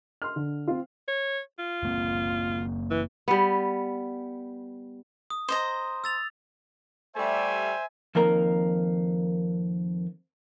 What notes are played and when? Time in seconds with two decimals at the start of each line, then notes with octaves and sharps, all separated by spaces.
0.22 C6 F6
0.36 D3
0.68 C4 F4
1.08 C#5
1.59 F4
1.83 F#1 A#3 C4
2.90 E3
3.28 G3 B3
5.30 D#6
5.48 C5 D#5 A#5
6.04 E6 A6 F7
7.16 G3 A3 C5 E5 G#5
8.15 F2 D#3 A#3 A#4 A#5